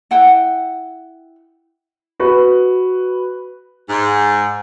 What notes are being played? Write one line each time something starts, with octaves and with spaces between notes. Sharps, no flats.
E4 F#5 G5
F#4 B4
G#2